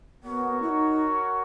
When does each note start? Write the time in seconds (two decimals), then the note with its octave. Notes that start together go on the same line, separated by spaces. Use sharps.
0.24 B3 F#4 A#4 C#5 F#5
0.62 E4
0.69 D#4